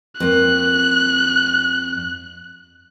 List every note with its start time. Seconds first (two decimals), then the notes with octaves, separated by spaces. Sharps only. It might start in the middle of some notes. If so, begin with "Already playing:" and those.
0.20 F2 A#3 F#6